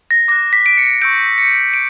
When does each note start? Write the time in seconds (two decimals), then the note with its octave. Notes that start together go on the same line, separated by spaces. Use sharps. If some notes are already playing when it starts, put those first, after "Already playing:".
0.11 A#6
0.28 D6 F#6 A#6
0.53 B6
0.66 D7
0.77 C#7
1.02 C#6 E6 G6 D7
1.38 C#7
1.74 D7